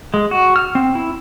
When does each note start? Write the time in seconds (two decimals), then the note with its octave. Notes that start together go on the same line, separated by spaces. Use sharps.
0.14 G#3
0.31 F#4
0.56 F6
0.75 C4
0.95 E4